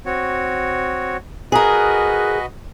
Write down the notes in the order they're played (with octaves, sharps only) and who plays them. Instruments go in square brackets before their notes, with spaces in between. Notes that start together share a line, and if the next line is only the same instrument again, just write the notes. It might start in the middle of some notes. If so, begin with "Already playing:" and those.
[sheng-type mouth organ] C4 F#4 C#5
[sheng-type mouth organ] F#4 B4 D#5 [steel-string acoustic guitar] G#4 A#4